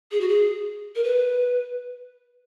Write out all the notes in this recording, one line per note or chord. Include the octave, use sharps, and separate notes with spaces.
G#4
F#4
G#4
A#4
B4